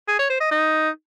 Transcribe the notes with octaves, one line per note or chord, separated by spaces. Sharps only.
G#4
C#5
C5
D#5
D#4